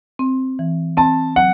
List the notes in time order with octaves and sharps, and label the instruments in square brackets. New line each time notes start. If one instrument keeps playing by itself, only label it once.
[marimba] C4
E3
[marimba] C4 [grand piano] A5
[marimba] F#3 [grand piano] F#5